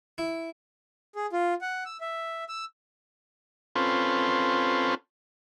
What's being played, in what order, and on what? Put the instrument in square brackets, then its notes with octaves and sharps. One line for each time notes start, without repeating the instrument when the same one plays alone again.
[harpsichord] E4
[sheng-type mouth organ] G#4
F4
F#5
E6
E5
E6
[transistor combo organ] C4 C#4 F4 A4 B4 C5